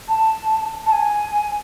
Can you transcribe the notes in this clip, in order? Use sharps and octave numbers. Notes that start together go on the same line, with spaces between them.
A5
A5
G#5